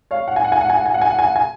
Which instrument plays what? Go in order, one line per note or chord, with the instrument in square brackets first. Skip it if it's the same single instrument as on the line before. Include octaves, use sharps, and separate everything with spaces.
[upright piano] C#5 F5
F#5
G#5
F#5
G#5
F#5
G#5
F#5
G#5
F#5
G#5
F#5
G#5
F#5
G#5